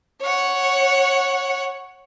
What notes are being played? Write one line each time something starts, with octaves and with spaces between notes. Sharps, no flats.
C#5 F#5